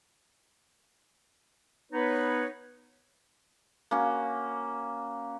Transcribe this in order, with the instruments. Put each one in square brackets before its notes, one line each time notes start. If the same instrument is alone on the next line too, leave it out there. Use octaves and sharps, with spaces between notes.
[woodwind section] B3 D#4 B4 C#5
[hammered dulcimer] A#3 C#4 F#4